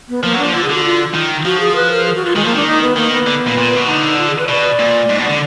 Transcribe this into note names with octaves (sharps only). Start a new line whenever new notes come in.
B3
F3 A#3
F#3
D4
F3
D3 F4
G#4
D3 F#4
F4
D#3
F3 F#4
G#4
B4
A#4
G#4
F#4
F4
D#3 G#3
F3 A#3
D#3 D4
D#4
B3
D#3 A#3
B3
D3
A#2
A#2
B2
D3 D#4
F4
G#4
B4
B2 D5
A#2
G#2
B2
D3